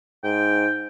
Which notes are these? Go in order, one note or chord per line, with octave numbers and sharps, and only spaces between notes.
G#2 G5